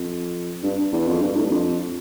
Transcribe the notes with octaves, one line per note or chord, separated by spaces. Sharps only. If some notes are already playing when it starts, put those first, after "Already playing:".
Already playing: F2
G2
E2
F2
G2
A2
G2
F2